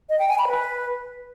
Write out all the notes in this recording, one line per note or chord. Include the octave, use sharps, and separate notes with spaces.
D#5
G5
G#5
B5
B4